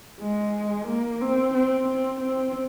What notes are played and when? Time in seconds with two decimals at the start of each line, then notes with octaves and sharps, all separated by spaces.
0.20 G#3
0.88 A#3
1.21 C4
1.54 C4
1.88 C4
2.21 C4